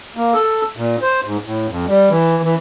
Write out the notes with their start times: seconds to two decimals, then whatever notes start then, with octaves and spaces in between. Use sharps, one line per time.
0.17 A#3
0.34 A4
0.76 A#2
1.02 C5
1.24 G#2
1.45 A2
1.68 F2
1.87 G3
2.10 E3
2.43 E3